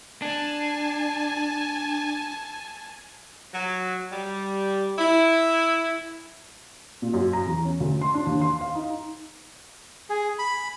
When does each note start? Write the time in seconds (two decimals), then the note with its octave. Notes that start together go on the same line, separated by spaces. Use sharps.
0.22 D4 G#5 A5
3.54 F#3
4.12 G3
4.98 E4
7.02 A#2
7.14 F#2
7.33 A#5
7.46 E2
7.63 C#4
7.80 D2
8.01 C6
8.14 D4
8.27 D#2
8.41 C6
8.61 F5
8.75 D#4
10.10 G#4
10.39 B5